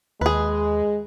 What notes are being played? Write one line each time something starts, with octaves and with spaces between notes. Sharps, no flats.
D#2 G#3 G#4 B4